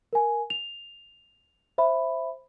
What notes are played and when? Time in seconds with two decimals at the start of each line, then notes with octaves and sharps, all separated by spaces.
0.13 A#4 G#5
0.50 F7
1.78 C5 E5 B5